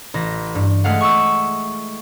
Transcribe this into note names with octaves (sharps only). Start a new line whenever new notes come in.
A1 A#6
G2
G#3 A3 F5 F#5
C#6 E6